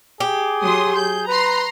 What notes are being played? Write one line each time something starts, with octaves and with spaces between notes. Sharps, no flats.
G4 G#4
F#3 C6 D#6
G#4 G6
B4 A#5 C6